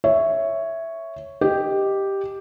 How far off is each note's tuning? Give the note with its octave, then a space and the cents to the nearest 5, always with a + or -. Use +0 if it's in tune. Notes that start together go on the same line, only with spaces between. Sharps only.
C#5 +0 E5 +0
G4 +0 D#5 +0